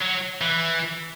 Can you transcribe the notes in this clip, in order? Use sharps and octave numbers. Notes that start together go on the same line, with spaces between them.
F#3
E3